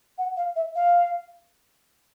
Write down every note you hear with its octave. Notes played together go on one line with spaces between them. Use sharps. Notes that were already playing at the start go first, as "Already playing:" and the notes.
F#5
F5
E5
F5